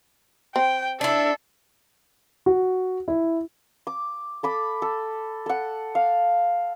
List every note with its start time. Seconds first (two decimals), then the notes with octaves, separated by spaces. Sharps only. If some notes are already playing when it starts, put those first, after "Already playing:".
0.56 C4 G5
1.01 D4 E4 A4
2.46 F#4
3.08 E4
3.87 D6
4.43 A4 B5 D6
4.82 A4
5.46 A4 F#5
5.95 F5